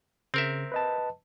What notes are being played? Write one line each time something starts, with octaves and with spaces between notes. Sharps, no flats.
C#3 C4 A#4 E5
B4 D#5 A5